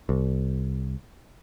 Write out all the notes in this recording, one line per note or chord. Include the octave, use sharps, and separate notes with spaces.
C2